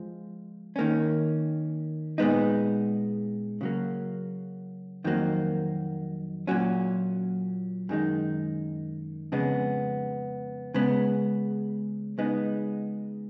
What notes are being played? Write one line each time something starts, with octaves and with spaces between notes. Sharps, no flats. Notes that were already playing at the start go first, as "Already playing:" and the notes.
Already playing: F3 G#3
D#3 A#3 C#4
A#2 G#3 B3 D#4
C#3 F#3 A#3
F2 D#3 F#3 A#3
A#2 F#3 C#4
F#2 D#3 G#3 D#4
F2 C#3 G#3 B3
C#3 G#3 B3
C#3 G#3 B3 D#4